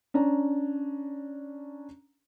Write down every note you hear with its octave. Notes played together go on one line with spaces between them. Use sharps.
C#4 D4 A#5